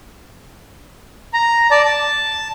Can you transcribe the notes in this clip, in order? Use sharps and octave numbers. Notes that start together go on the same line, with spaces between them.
A#5
D5 A5
A5